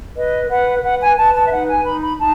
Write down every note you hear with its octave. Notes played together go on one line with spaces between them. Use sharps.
B4 D#5
B4 F#5
B4 F#5
G#5
B4 A5
A5
E5
D#4 F#5
G#5
D#4 B5
B5
D#4 A5